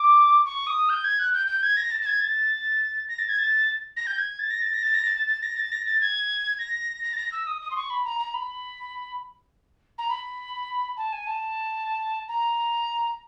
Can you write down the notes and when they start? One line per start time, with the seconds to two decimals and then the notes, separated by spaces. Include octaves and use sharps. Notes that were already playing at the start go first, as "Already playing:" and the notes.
Already playing: D6
0.45 C#6
0.67 D#6
0.89 G6
1.04 G#6
1.19 F#6
1.33 G6
1.47 G6
1.63 G#6
1.77 A#6
1.91 A6
2.01 A6
2.06 G#6
2.20 A6
3.08 A#6
3.18 A6
3.29 G#6
3.38 A6
3.96 A#6
4.07 G6
4.18 G#6
4.39 A6
4.50 A#6
4.61 A6
4.73 A#6
4.83 A6
4.94 A#6
5.05 A6
5.27 A6
5.42 A#6
5.56 A6
5.72 A#6
5.85 A6
6.01 G#6
6.59 A#6
7.03 A#6
7.13 A6
7.17 A#6
7.32 E6
7.47 D#6
7.61 D#6
7.71 C6
7.76 C#6
7.90 B5
8.05 A#5
8.19 A#5
8.34 B5
9.98 A#5
10.09 B5
10.97 A5
11.12 G#5
11.27 A5
12.28 A#5